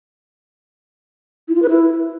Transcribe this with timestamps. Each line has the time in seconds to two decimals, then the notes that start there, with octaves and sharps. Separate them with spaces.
1.48 E4
1.55 F4
1.62 B4
1.69 E4